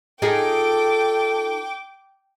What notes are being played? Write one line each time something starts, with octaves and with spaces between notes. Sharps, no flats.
D#4 F4 G#4 A4 G5 D6